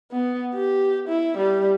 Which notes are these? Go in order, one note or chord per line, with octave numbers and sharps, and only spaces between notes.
B3
G4
E4
G3